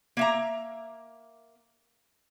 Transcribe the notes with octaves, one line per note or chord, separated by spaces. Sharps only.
A#3 E5 A#5